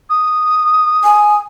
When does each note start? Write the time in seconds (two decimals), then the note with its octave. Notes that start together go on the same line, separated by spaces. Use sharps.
0.10 D#6
1.03 G#5